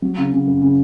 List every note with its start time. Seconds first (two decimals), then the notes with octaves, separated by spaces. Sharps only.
0.02 F#3
0.18 C#3
0.32 C#3
0.47 F#2
0.61 C#3